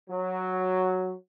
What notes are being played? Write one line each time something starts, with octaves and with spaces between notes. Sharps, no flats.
F#3